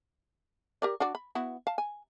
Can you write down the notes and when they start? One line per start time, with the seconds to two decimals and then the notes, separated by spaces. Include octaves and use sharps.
0.82 G4 A#4 D5
1.00 D4 F#4 D5
1.15 B5
1.35 B3 E4 F#4
1.67 F5 A5
1.78 G#5